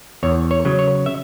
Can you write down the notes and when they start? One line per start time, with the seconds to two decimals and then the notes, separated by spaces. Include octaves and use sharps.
0.23 E2 C#5
0.51 C#5
0.65 C#3 F#3
0.79 C#5
1.06 E5